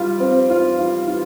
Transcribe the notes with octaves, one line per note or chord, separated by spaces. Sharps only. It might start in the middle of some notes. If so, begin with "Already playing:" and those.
Already playing: G3 F4
C4
F4
F4
F4